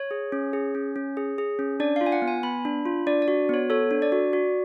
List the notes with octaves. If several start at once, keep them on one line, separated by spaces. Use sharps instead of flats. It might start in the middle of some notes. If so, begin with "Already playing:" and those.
Already playing: C#5
G#4
C#4
G#4
C#4
C#4
G#4
G#4
C#4
D4 D5
F4 F5
G#5
F#5
B3
G#5
B3 B5
D4
F4
D4 D5
D5
F#4
B3 C#5
A4 C#5
D4
D5
F#4
F#4